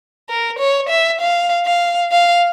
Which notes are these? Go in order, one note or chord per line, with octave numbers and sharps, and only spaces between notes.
A#4
C#5
E5
F5
F5
F5